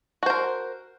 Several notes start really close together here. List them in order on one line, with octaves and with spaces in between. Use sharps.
F#4 C5 A#4